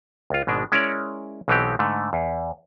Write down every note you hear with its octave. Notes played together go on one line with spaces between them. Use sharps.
C#2 F4
G#1 B2 G#3 D4
G#3 C#4 E4 A#4 C#5 D5
B1 B2 E3 B3 C4 G4
G#2 D3 A3
E2